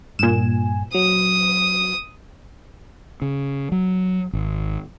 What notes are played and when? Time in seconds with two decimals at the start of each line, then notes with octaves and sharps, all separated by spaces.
0.19 G2 A#2 G#5 E7
0.94 F#3 D#6
3.22 C#3
3.72 F#3
4.33 G#1